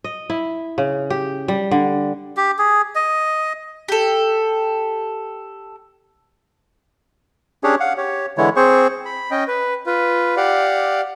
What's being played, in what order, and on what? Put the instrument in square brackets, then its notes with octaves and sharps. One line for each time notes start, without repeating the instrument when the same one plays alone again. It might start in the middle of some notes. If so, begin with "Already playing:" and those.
[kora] D#5
E4
C#3
G4
G3
D3
[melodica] G4
G#4
D#5
[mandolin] G4 A4
[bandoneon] C#4 D4 G4 G#4 C#5
F5 F#5
G4 C#5
D3 E3 G#3 E4 C#5
C4 G#4 C5 C#6
[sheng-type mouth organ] B5
C#4 D#5 G5
B4
F4 B4
G4 D5 F5 F#5